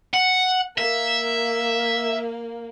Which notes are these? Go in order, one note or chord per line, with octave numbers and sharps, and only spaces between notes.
F#5
A#3 E5